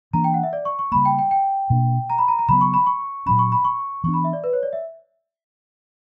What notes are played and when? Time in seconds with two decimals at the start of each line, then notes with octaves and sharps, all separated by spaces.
0.13 E3 A#3 D4 A#5
0.24 G5
0.34 F#5
0.43 E5
0.53 D5
0.65 C#6
0.79 C#6
0.92 C#3 G3 A#3 B5
1.05 G5
1.19 G5
1.31 G5
1.70 B2 A#3 D4
2.10 A#5
2.18 B5
2.28 A#5
2.39 A#5
2.49 C#3 F#3 B3 B5
2.61 C#6
2.74 B5
2.86 C#6
3.26 A#2 F#3 C#4 B5
3.39 C#6
3.52 B5
3.65 C#6
4.04 E3 B3 D4 C#6
4.14 B5
4.24 E5
4.33 D5
4.44 B4
4.53 C#5
4.63 D5
4.73 E5